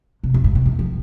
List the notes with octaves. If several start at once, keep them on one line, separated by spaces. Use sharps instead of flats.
C3
F2
G2
C#3
D#3
F3